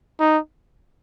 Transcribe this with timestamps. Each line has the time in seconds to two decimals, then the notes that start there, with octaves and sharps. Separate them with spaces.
0.20 D#4